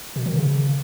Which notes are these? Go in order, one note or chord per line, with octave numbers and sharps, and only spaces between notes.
B2
D#3
C#3